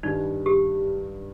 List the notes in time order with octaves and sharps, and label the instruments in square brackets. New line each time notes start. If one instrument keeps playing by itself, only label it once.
[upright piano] G2 D#3 G3 [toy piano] D#4
[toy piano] G4